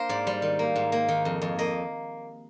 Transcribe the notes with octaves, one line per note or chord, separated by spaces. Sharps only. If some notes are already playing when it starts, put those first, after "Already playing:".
Already playing: A#3 D4 A#4 C5
G#2 D5
G3
D#3
A#3
G#2
A#3
D#3
F2
F2
A#3 D#5